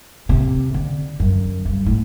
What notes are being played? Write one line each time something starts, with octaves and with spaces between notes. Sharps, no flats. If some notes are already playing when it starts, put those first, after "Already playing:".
C3
D3
F#2
G2
A2